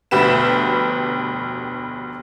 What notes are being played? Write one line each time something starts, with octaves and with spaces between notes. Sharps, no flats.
F1 D2 B2 G4 B4 E7